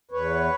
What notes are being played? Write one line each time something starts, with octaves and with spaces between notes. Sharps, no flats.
E2 B4 C#5